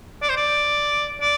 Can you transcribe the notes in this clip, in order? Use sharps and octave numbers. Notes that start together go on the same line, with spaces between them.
D5
C5
D5
D5